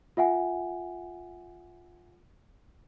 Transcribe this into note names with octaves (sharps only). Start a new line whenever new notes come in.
F4 E5 F#5 G#5